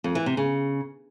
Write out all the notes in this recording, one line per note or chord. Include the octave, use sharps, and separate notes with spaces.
F2
E3
C3
C#3